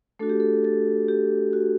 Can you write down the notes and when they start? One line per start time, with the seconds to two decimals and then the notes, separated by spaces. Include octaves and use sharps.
0.19 A3 D4 F#4 A4
0.30 G4
0.40 A4
0.65 A4
1.09 G4
1.53 F#4